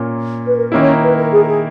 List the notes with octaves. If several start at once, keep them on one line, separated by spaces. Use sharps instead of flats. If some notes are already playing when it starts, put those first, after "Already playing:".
Already playing: A#2 A#3 C#4
B4
A#4
D#3 A#3 C#4 E4 C#5
B4
A#4
G#4
A#4
G#4